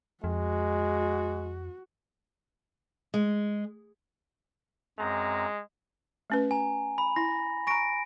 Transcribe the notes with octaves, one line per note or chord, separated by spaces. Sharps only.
F2 G#3 F#4
G#3
F#2 G#3 C4 A#5
A3 C#4 B4
G#5 A#5
B5
E4 A#6
G#5 A#5 C#6 A#6 D7